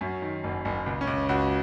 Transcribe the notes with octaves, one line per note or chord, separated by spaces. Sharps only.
F#2 C#4
D#3
F#1
F#1
C#2
C#4
C#2
C#2 F#4